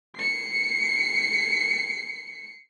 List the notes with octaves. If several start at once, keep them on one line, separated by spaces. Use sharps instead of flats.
C7 C#7